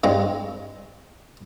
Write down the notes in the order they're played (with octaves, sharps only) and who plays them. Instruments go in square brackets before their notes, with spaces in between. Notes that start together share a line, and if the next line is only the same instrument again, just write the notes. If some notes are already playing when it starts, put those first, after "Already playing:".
[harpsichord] G2 G#3 C4 A#5